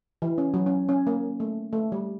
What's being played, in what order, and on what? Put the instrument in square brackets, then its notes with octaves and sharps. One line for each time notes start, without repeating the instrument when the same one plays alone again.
[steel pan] E3
C#4
F#3
C#4
C#4
A#3
A3
A3
G3